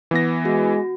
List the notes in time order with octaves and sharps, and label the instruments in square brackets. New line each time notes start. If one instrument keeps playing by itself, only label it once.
[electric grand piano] E3 B3 A#6
[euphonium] G#3 [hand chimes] F#4